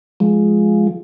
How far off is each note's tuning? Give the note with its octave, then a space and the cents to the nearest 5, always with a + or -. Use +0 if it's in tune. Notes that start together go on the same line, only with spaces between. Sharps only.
F3 +0 G#3 +10